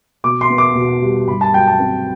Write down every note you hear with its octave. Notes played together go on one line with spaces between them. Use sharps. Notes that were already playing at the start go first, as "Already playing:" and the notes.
B2 D6
C6
B3
D6
B2
G3
G2 B5
A5
F#3 G5
A5
C4